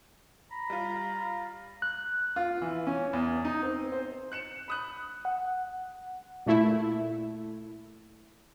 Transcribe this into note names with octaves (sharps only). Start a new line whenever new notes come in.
A#5 B5
G3 F4
F#6
F4
E3
C#4
E2
D#4
C4
C5
F#6 C#7 E7
B5 D#6 F#6
F#5
A#2 A3 E4